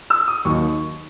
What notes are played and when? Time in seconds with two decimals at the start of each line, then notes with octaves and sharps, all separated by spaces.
0.10 E6
0.28 D#6
0.45 D#2 D#3 F#3 A#3 D#4 C#6